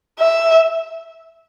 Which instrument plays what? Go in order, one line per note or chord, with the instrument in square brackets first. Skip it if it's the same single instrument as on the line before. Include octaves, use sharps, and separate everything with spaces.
[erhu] E5